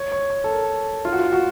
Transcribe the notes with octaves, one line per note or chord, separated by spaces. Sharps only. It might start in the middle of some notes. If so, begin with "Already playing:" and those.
Already playing: C#5
C#5
C#5
A4
A#4
F4
F#4
F4
F#4